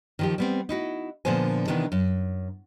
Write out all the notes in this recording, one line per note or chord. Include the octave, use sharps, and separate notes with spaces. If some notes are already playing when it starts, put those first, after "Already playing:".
D#3 F3 G4
G3 B3 C4
D#4 E4 F#4
A#2 D3 F3 B3 C5 G#5
C3 D#3 E3 B3 D4
F#2